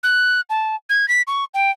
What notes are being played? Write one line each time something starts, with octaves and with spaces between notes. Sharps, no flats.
F#6
A5
G#6
B6
C#6
G5